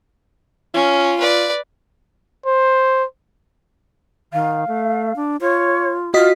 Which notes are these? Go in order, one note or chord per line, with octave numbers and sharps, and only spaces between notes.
C#4 F4
B4 D5
C5
D#3 F5
A3
D4
F4 C#5
F4 F#4 D#5 B6